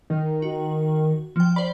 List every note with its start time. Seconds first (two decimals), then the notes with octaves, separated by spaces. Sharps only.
0.10 D#3
0.42 F#4
1.36 F3 G5
1.56 C5 D5 B5